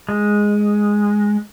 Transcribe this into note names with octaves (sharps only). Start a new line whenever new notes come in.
G#3